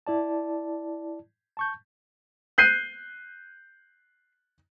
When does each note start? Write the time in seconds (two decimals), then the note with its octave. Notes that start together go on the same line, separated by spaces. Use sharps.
0.07 E4 D5 A5
1.57 A5 C#6 G6
2.58 F#6 G6 C7 D#7